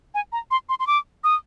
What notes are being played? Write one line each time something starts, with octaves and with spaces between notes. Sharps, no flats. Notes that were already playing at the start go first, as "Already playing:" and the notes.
G#5
A#5
C6
C6
C6
D6
D#6